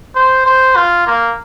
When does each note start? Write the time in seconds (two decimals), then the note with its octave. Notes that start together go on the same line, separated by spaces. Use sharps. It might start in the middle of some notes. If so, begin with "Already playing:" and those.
0.15 C5
0.46 C5
0.76 F4
1.07 A#3